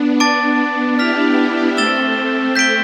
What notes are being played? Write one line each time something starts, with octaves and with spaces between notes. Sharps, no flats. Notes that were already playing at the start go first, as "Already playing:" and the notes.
Already playing: B3 D4
A5 D6 A6 D7
E4 G4 F6 B6 F7
A3 C4 E6 A6 E7 G7
G6 B6 D7 G7